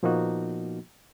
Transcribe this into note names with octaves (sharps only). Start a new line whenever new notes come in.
A#2 F3 A#3 B3 D#4 F#4